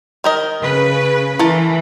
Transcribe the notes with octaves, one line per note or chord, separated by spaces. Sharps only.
D#3 A#4 D#5
C#3 B4
E3 E4 A4 A#4 A5